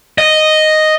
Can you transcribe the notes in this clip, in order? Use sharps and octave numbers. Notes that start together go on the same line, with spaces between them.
D#5